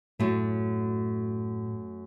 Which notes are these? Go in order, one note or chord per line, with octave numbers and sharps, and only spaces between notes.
F#2 A2 A3